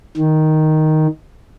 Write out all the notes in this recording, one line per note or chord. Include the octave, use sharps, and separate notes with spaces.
D#3